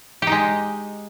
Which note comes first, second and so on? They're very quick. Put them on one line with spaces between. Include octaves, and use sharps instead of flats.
G4 D#4 G#3